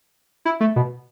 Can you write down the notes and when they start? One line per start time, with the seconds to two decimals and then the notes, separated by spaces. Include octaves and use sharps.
0.45 E4
0.60 A3
0.76 B2